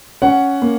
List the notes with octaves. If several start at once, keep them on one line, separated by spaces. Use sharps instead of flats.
C#4 F#5
A#3